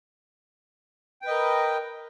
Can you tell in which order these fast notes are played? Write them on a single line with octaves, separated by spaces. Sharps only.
G5 B4 D#5 A#4